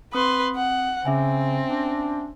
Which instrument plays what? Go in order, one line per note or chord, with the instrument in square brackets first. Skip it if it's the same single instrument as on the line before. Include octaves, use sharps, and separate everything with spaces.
[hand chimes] C4 D#6 [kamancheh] B4 C6
[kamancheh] F#5
[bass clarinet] C#3 [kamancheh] C4 [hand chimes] C#4 E5 G#5
[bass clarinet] D4